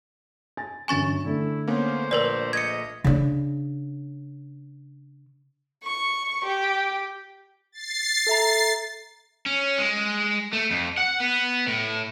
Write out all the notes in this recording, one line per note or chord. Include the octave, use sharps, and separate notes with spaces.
G#5 A6
G1 F#2 G#5 C#6 A6 E7
D3 A3 E4
A#3 B3 C#4 C5
A#1 A#4 B4 D5
D#5 G#6 C#7
C#3 D4
C#6
G4
A6 C7
A4 E5 A#5
C#4
G#3
A3
F2
F#5
B3
A2